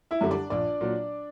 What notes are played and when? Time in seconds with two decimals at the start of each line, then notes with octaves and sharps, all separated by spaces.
0.11 E4 E5
0.21 F#2 D3 G3
0.31 D4 D5
0.50 A#1 D4 D5
0.81 A#2 F#3